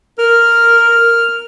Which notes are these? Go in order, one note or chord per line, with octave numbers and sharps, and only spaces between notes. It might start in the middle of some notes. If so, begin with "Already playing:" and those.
A#4 F6